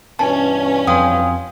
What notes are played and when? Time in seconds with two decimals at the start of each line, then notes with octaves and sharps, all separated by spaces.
0.19 G2 B2 E3 C#4 A5
0.87 F2 F5 G5 G#5 C6 D#6